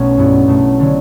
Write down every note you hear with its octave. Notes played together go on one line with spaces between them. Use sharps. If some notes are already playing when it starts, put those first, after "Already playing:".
Already playing: B1 B2 A3 C#4
G2 F#3 B3 E4
B1 B2 A3
D3 F#3 C#4